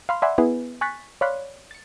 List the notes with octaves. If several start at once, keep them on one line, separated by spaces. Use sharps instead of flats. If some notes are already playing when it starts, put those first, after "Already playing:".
F5 B5 C6 F6
D5 E5 F#5 G#5 B5 C6
B3 E4 G#4 B4
G#5 C#6 F#6 A6 B6
C#5 D5 F5 B5 C6 F#6
A6 C#7